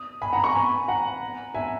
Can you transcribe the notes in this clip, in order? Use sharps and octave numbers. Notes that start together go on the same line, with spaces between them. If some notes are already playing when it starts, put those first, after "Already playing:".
Already playing: D#6
G#5 B5
F#5 A#5
A#5 C#6
G#5 B5
F#5 A#5
E5 G#5